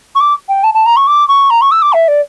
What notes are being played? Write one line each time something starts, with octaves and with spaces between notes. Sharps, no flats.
C#6
D6
G5
A5
A5
A#5
C#6
D6
C#6
A#5
C#6
E6
D6
E5
D5